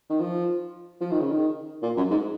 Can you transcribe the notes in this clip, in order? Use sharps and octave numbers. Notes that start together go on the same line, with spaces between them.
D#3
F3
F3
D#3
C#3
D#3
A#2
F#2
G#2